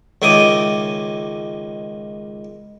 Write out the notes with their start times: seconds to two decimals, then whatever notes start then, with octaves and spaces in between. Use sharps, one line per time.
0.22 C#2 D#3 E4 D6 D#6